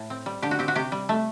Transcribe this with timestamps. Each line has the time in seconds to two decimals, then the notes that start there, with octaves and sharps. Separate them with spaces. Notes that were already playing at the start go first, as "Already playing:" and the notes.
Already playing: A2
0.10 C4
0.26 G3
0.42 D3 G4
0.51 F#4
0.59 C4 G4
0.68 F#4
0.75 C3 G4
0.92 G3
1.09 A3